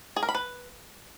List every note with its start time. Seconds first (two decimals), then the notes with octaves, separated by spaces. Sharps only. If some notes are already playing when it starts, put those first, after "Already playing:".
0.16 G#4
0.22 A#4
0.29 B5
0.35 B4